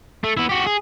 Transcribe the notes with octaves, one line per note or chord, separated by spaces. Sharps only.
A3
B3 E4
F#4 G4
G#4